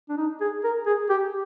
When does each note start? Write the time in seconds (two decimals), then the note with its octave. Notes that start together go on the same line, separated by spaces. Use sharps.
0.09 D4
0.17 D#4
0.40 G#4
0.64 A#4
0.86 G#4
1.09 G4